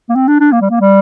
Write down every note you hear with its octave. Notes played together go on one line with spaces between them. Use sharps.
A#3
C4
D4
D4
A#3
G3
A#3
G3